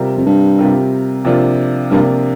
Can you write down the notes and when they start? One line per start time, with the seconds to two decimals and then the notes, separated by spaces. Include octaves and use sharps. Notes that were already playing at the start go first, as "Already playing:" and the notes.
Already playing: C3 G3 C4 F4 A#4
0.17 F2
0.26 G2
0.58 C3 G3 C4 F4 A#4
1.25 C3 F3 A#3 D4 F4
1.90 G2 C3 F3 A#3 D4 F4